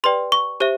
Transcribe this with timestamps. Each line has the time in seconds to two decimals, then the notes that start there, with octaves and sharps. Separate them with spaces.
0.04 G4 B4 D5 G5 C6
0.32 C#6
0.60 G4 C5 E5